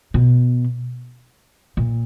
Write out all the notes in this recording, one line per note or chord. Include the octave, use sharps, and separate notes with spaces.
B2
A#2